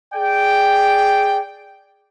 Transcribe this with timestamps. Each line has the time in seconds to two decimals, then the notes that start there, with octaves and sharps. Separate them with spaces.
0.14 G#4 D5 G5